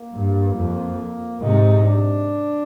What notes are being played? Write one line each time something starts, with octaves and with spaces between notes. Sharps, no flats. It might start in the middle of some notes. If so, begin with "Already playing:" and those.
Already playing: A#3
G2
F2
G#2 C3 D#4
D4